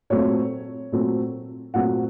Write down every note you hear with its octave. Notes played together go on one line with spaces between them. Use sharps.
A#2 F#3 A3 C4 C#5
A#2 F#3 A3 C4
A#2 F#3 A3 C4 F#5